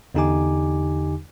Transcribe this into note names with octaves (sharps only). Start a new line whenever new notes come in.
E2 D3 D#4 G4 G#5 D6